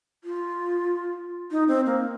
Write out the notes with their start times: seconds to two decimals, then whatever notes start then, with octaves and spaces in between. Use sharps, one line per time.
0.24 F4
1.51 D#4
1.68 C4
1.86 A#3